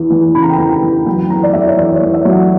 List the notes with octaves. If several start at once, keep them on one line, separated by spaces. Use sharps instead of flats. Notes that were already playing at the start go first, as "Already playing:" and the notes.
Already playing: E2 E3
E2
C#3 B5
A#5
G5
E2 A#5
E2
F#3 G5
E2 A#5
D5
E2 E5
C#5
E2 D5
C#5
E2
E5
F#3
F#5